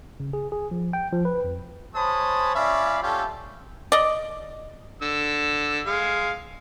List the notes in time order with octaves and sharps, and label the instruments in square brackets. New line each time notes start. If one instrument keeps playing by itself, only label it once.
[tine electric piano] C#3
G#4
G#4
F3
G5
F3
B4
F2
[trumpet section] G#3 C5 C#5 A5 B5 D#6
C#4 F4 D5 E5 F5 B5
G3 A3 C#4 F4 G4 A4
[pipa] D5 D#5
[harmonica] D3 E6
G#3 F5